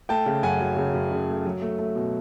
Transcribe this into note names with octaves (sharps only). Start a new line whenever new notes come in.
A3 G5 A5
C#3
F#2 F#5 G#5
F#3
C#3
F#2
C#3
A3
F#3
A3
A3
B2